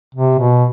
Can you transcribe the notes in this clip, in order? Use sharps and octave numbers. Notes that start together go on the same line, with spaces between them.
C3
B2